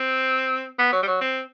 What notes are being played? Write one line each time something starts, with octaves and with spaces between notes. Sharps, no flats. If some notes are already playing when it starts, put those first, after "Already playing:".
Already playing: C4
B3
F#3
G3
F#3
C4